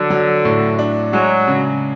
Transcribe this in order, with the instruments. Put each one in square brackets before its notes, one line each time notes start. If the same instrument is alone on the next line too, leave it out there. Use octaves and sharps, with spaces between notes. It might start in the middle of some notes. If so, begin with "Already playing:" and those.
Already playing: [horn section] D3 [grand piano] F#3
[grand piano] F#3
A2
D4
[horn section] F#3 [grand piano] G#3
[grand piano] C#3